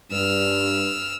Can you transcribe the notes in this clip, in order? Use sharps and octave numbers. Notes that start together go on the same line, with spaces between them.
G2 E6 F6